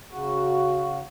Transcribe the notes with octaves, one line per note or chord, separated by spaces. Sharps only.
C#3 F#4